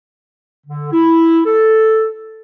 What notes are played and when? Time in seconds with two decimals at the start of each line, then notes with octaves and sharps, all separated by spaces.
0.67 D3
0.92 E4
1.46 A4